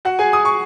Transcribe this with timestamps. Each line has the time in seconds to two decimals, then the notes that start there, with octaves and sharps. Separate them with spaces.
0.05 F#4 F#5
0.19 G#4 G#5
0.33 D#6
0.45 C#6